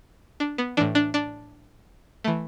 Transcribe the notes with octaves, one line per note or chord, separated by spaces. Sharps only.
D4
B3
A2 E3 D4
D4
D4
E3 A3